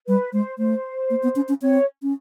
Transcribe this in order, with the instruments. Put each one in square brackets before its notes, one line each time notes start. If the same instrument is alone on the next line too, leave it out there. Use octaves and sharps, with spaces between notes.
[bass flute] G3 [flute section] B4
[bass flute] G#3 [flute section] C5
[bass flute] A3 [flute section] C5
[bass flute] A#3
B3
C#4
C#4
[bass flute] C4 [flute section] C#5
[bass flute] C#4